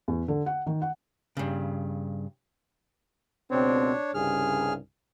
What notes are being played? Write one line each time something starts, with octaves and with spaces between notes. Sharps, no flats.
E2
D3
F#5
D#3
F#5
G2 C#3
C#2 B2 C4 D4 C#5
C2 G2 C#3 G#4 F6